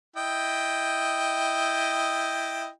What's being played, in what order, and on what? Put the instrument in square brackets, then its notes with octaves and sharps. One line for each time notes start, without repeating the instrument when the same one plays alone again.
[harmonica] E4 D#5 G5